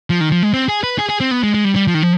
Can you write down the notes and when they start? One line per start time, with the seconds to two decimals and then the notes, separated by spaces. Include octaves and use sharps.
0.10 F3
0.20 D#3
0.32 F3
0.43 G#3
0.54 C4
0.68 G#4
0.83 B4
0.99 G#4
1.09 G#4
1.21 C4
1.31 B3
1.43 G#3
1.54 G#3
1.65 G3
1.76 G3
1.87 F3
1.94 D#3
2.02 F3